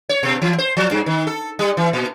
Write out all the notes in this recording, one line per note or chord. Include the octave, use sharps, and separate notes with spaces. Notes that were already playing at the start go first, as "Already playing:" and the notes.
C#5
B2
E3
C5
F3
G2
D#3
A4
G3
E3
A#2